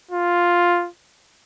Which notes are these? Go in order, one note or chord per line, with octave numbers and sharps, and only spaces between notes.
F4